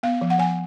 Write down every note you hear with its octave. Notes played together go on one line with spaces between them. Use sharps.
B3 F5
F3
F#5
F3 G#5